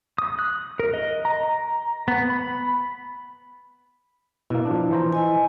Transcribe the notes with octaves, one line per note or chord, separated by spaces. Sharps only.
D#6
F#6
A#4
D#5
A#5
A#5
B3
B5
B2 A#3 E4
F3 D4
E3 C5 A#5
E4 D#5 G#5